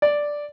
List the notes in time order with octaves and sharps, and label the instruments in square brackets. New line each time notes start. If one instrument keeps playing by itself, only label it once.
[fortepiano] D5